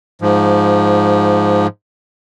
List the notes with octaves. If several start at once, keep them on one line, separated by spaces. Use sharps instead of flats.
G#2 F3